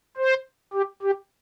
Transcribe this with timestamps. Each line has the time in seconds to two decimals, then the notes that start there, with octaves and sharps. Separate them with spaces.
0.17 C5
0.74 G4
1.03 G4